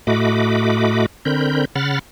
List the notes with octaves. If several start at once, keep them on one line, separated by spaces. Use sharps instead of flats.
A2 A3 F#4 D#5 B5 D6
D3 C4 A#4 B5 G6
C#3 F#5 B5 F6 A6